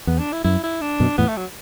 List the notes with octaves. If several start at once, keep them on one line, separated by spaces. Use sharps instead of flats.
E2 B3
D4
E4
F#2 E4
E4
D4
F#2 B2
E2 A2 B3
A3
F#3